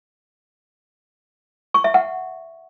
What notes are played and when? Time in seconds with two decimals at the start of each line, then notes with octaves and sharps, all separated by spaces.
1.74 C#6
1.84 E5
1.94 F#5